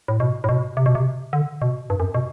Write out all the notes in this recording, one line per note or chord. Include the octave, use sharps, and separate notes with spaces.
A2
B2
A2
B2
C3
B2
C3
D3
B2
G2
F#2
B2